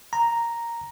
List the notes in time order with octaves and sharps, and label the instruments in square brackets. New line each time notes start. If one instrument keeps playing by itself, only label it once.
[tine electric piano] A#5